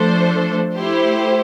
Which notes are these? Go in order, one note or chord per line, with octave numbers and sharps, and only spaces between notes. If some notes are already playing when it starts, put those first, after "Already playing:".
Already playing: F3 A3 D4 A4 C5
A3 E4 G4 C5